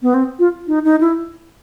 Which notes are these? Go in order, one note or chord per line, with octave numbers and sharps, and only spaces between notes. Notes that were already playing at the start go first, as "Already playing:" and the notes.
B3
C4
F4
D#4
D#4
E4